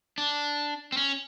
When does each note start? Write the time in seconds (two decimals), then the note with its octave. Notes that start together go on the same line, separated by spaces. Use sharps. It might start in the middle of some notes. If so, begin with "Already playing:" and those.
0.18 D4
0.92 C4
0.97 C#4